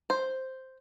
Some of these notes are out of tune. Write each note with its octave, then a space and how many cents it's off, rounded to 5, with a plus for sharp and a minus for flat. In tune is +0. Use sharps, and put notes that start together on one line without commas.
C5 +0